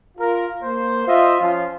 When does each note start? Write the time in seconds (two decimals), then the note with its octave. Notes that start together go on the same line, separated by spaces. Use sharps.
0.18 F4 A#4
0.62 A#3 C5
1.07 F4 C5 D#5 E5
1.40 F3 C#4 F4